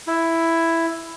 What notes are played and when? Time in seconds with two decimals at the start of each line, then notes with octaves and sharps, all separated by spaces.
0.07 E4